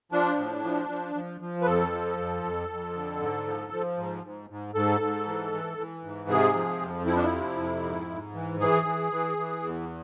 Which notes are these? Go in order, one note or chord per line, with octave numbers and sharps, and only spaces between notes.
F3 D4
A2
F3
F3
F3
F3
B4
F2 A4
F3
F2
F2
F2
D3
G#2
F3
F3
G#2
G#2
G#2
G#2 A4
G#2
E3
E3
E3
G#2
C3 G#4
F3
F2
F3 E4
D4
E4
C3
F2
G#2
G#2
E3
E3 G#4
E3
E3
E3
E2